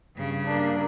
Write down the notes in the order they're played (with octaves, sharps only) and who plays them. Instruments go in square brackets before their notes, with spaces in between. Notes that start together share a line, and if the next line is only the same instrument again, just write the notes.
[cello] G2 C#3
[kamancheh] A#3 D4